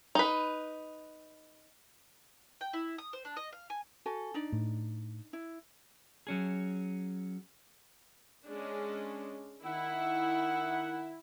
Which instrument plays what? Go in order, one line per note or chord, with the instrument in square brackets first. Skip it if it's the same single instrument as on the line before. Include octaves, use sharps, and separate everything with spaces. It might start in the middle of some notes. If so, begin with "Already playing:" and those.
[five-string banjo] D#4 B4
[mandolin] G5
E4
D#6
C5
D4
D#5
F5
G#5
[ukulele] F#4 A4 G#5
D4 D#4 D5
[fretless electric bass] A2
[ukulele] E4
[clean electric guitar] F#3 C#4 G#4
[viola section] G#3 C#4 D4
[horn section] D#3 F#5 [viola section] E4